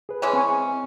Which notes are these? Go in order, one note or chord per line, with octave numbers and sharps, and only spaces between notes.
G#4 B4
E3 G#3 C#4
C4 G#5 C#6